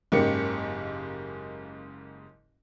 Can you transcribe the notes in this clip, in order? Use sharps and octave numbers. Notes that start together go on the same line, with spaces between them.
F#1 G#2 C#3 A#3 G4 C#7